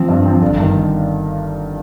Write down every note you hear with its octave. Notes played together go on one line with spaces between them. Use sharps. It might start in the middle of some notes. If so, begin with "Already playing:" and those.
Already playing: F3 C4
G2
F3 C4
G1
G2 D#3